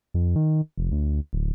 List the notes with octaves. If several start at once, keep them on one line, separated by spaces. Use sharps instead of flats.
F2
D#3
F1
D2
D1